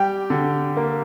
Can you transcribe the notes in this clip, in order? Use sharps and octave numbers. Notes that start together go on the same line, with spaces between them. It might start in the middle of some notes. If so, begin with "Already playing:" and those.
Already playing: G3 G4 G5
D3
A#3